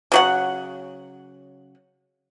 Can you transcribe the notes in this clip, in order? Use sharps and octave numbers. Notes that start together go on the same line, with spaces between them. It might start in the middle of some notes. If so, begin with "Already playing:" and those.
C#3 F#3 F#5